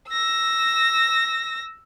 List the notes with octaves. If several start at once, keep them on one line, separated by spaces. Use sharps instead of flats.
E6 A#6